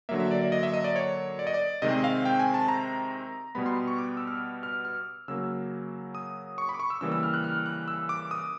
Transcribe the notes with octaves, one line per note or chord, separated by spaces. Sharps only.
D3 F#3 A#3 E5
E5
D5
D5
D#5
E5
D#5
D5
C#5
D5
D#5
D5
C3 D#3 G#3 C4 D#5
F5
G5
G#5
A5
A#5
B2 G3 B3 B5
C6
C#6
D6
E6
F6
F6
F6
C#3 F#3 A#3 E6
D#6
C#6
B5
D6
C#6
E6
C#3 E3 G3 A#3 E6
E6
F6
F#6
F6
F#6
E6
D6
D#6